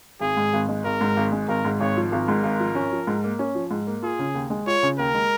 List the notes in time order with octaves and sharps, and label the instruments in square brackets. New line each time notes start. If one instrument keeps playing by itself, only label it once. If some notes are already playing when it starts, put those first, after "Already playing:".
[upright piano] G#1 [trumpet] G#4
[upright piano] G#2
G#1
G#3
[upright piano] G#1 [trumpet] A#4
[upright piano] G#2
G#1
G#3
[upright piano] G#1 [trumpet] A#4
[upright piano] G#2
[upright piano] G#1 [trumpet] C#5
[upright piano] F3
[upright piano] G#1 [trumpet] A#4
[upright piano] G#2
G#1
F3
C#4
F3
G#2
A#3
C#4
F3
G#2
A#3
[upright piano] F4 [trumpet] G#4
[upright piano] C#3
D#2
G#3
[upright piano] F4 [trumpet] C#5
[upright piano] C#3
[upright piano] D#2 [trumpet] A#4
[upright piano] G#3